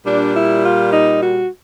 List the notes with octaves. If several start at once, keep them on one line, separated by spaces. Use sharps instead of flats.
A#2 G3 D4
E4
F4
D#4
F#4